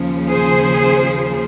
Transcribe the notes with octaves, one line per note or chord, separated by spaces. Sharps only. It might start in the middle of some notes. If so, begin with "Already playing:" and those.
Already playing: D#2 C#3 F3
G#4 C5